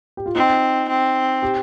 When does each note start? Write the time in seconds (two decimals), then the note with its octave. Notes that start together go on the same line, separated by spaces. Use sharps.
0.17 G4
0.26 F4
0.35 C4 D#4
0.89 C4
1.43 G4